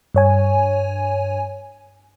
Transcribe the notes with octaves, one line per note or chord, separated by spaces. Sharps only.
G2 C#5 G#5